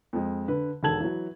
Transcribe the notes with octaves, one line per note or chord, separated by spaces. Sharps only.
F2 G#3
D3 B4
E1 D#3 A4 A5 G#6 F#7
E3 F#3